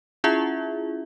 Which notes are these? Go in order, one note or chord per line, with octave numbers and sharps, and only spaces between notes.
C#4 E4 F4 G#4 E5